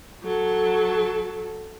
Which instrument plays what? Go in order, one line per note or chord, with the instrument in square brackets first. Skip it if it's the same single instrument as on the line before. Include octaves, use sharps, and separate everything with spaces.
[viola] F#3 A4